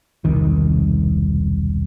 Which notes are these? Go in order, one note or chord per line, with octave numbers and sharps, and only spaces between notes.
E1 C2 D#3